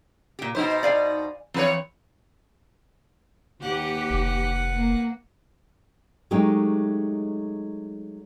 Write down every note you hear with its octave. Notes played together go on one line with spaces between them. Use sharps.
A#2 G4
B2 D#4 B4 C5 G5
D5 F5 G#5
E3 C4 B4 C#5
D#2 G4 B4 F#5
F1
A#3
F#3 G#3 A3 D#4 G4